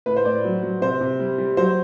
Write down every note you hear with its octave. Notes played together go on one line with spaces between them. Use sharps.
A2 B4
C5
A2 D5
F#3
F#3
C3 C5
C3
G3
G3
F#3 C5